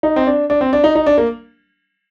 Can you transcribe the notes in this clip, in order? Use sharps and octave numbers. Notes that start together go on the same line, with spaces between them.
D#4
C4
D4
D4
C4
D4
D#4
D#4
D4
A#3